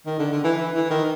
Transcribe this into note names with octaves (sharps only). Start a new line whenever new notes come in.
D#3
D3
D3
E3
E3
E3
D#3